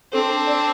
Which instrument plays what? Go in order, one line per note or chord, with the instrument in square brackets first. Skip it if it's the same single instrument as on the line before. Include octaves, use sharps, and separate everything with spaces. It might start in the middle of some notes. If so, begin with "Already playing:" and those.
[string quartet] C4 D4 [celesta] A4
[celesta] A5
D5